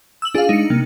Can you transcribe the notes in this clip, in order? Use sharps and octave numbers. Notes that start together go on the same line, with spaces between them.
E6 F#7
D4 F4 G#4 F5
G#3 D#4 C#7
C3 A#3